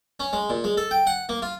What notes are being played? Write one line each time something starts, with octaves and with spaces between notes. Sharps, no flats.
C#4
G#3
A#2
G#3
A4
G5
F#5
A#3
F4